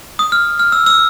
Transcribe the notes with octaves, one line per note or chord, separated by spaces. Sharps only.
D#6
F6
F6
E6
E6